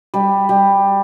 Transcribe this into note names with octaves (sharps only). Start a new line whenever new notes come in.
G3
G3